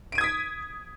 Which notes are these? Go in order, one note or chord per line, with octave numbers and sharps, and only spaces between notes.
D#6 G#6 B6 D7 D#7